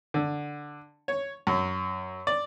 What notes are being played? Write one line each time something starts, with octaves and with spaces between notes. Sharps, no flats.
D3
C#5
F#2
D5